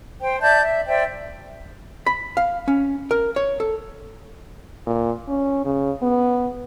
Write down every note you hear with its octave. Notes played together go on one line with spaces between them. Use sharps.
C5 G5
D5 E5 A5 G6
E5
C5 D5 E5 G5
B5
F5
C#4
A#4
C#5
A4
A#2
C#4
C#3
B3